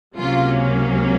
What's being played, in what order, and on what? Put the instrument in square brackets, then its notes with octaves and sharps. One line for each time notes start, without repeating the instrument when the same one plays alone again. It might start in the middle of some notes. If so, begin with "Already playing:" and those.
[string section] C#2 C3 F#3 A#3 C#4 F4